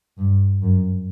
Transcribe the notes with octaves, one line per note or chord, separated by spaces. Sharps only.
G2
F#2